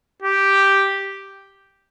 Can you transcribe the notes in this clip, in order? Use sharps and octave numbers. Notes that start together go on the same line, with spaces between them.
G4